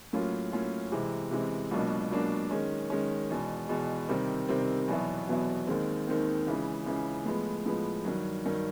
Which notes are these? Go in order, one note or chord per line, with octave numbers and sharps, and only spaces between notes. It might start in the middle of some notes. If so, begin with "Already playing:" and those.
A2 F#3 A#3 C#4 F4
A2 F#3 A#3 C#4 F4
C3 E3 G#3 C4
C3 E3 G#3 C4
C#2 B2 F#3 A#3 D4
C#2 B2 F#3 A#3 D4
D#3 G#3 C#4
D#3 G#3 C#4
E2 B2 G#3
E2 B2 G#3
C3 D#3 G3 C4
C3 D#3 G3 C4
E2 B2 F#3 B3 E4
E2 B2 F#3 B3 E4
D#2 D#3 G#3 C4
D#2 D#3 G#3 C4
C#2 C#3 E3
C#2 C#3 E3
A2 F3 G#3 B3
A2 F3 G#3 B3
G2 D#3 F#3
G2 D#3 F#3